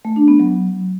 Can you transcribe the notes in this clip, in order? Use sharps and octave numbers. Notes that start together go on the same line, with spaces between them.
A3
D4
B3
F#3